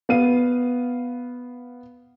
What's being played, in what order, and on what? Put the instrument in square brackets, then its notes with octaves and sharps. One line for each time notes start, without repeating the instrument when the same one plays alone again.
[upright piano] B3 F5 D#7